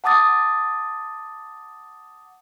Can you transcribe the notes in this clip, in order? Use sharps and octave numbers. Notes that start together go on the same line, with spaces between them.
F#5 A5 D6 D#6 A6